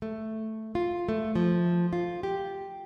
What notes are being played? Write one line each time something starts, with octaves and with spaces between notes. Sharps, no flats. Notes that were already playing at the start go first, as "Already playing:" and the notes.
A3
F4
A3
F3
F4
G4